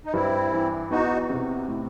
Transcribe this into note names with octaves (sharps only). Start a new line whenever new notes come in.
D#4
G2 C4 E4
E3
E2 D#4 F#4
C3
A2